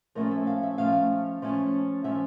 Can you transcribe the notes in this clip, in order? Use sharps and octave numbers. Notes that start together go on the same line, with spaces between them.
F3 A3 C#4 A#4
E5
F5
E5
F3 A3 C#4 F5
F3 A3 C#4
F3 A3 C#4 E5